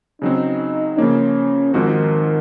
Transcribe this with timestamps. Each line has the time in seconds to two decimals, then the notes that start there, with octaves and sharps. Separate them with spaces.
0.22 C#3 F#3 C4 D#4
0.97 C#3 F3 A#3 C#4
1.74 G#2 D#3 F3 C4 D#4 F#4